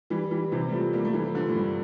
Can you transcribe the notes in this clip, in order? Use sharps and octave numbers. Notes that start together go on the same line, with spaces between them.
E3 G3
E3 G3
C3 E3
G3
F3 A3
G3 A#3
A3
E3 G3
D3 F3
A2
G2